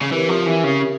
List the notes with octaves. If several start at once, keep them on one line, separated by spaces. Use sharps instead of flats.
C#3
E3 C4 G4 A#4 C#5 E5
F3
E3
C#3